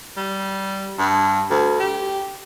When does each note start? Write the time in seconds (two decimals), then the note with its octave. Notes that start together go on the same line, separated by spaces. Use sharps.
0.17 G3
0.98 G2
1.50 D2
1.80 G4